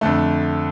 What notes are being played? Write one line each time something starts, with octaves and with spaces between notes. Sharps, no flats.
F2 D3 A3